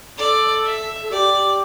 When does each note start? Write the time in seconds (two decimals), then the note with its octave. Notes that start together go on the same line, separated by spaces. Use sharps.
0.18 A4 D5
0.65 E5
1.02 A4
1.11 G4 D5